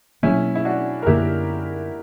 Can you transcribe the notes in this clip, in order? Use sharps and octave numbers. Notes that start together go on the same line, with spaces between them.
B2 F#3 A#3 C#4 E4
E4
D4 F#4
A#4
F#2 D3 A#3 D4 E4 G4